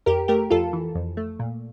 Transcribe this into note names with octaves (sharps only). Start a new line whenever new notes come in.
F2 G4 A#4
A3 G4 A#4
F2 F4 A4
E3
F2
A3
A#2